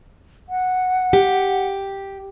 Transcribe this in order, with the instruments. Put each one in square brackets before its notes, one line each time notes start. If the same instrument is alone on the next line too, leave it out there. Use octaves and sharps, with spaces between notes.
[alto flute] F#5
[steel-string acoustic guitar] G4